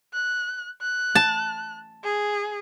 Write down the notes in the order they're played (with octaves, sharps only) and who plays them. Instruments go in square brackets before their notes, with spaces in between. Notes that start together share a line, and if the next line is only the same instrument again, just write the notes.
[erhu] F#6
F#6
[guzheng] A5
[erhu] G#4